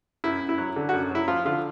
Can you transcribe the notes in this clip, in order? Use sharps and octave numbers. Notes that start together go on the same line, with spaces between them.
F#2 E4
F#2
E4
F#3
D3
F#4
F#2
F#3 E4
F3 F4
D3 F4